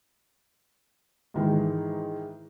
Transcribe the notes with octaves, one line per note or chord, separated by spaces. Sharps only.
G#2 D#3 E3 G#3